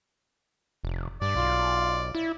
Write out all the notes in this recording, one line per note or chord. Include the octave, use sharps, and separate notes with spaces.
F1
G2 D5
B1 F4
E4